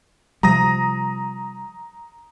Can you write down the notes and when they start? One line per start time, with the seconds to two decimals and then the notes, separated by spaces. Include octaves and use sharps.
0.43 C3 F3 G3 A#5 D#6 A#6